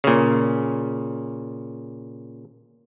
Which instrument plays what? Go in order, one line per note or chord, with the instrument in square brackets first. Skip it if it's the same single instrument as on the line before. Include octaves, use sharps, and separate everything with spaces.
[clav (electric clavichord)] A#2 C#3